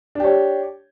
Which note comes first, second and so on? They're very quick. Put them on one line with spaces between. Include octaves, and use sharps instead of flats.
D4 G4 C#5